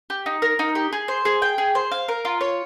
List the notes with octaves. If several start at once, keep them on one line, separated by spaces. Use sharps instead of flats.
G4
D#4
A#4
D#4
G4
G#4
C5
G#4
G5
G#4
C5
F5
A#4
F4
C#5